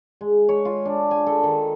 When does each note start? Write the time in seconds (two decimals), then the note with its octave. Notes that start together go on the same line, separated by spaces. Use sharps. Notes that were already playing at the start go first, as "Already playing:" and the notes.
0.21 G#3
0.49 C#5
0.65 F4
0.85 D4
1.11 G#5
1.26 A4
1.43 D#3